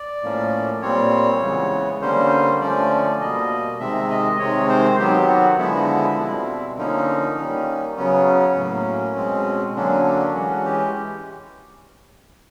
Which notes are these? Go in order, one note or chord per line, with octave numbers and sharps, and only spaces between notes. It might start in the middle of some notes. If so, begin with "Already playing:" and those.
Already playing: D5
A2 F3 A#3 C#4
A#2 G3 C4 C#5
C#3 E3 G#3 B3
D3 G3 A#3 C#4 C5
D3 F3 A3 C#4 D5
B2 G3 A#3 D#5
C3 D#3 G#3 C4 E5
D#5
C3 D#3 G#3 C4 C#5
C5
D#3 F#3 B3 G4
F#4
D3 F3 G#3 B3 E4
B2 G3 C4
D3 F3 A#3 C#4 D#4
D#3 G3 A#3 C#4
C#3 F#3 B3 C#4
C#4
A2 F#3 A#3
B2 G#3 C4
D3 F#3 A#3 C#4 D4
D4
E3 G#3 C#4 F#4
G4